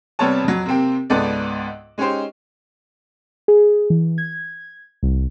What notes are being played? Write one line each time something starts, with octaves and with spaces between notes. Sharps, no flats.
C3 G3 B3 C4 C#5 A5
F2 F#3
C3 A#3 C4 G4
C#2 G#2 B3 A4 D5
G#3 C#4 D#4 G4 C5
G#4
E3
G#6
C2